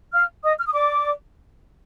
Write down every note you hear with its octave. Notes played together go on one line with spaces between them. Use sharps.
F5 F6
D#5 D#6
F6
D#6
D5 D6